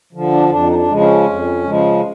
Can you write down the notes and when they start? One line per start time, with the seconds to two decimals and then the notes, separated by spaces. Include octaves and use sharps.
0.13 D3 F3
0.31 D4
0.50 F2 D4
0.68 D#4
0.75 D4
0.88 C#3 F3 G#3
1.00 C#4
1.26 F2
1.64 C#3 F3 G#3